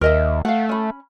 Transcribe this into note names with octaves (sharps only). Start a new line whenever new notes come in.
D#2 A#4 D#5 E5
A3 F5 F#5
C#4 B5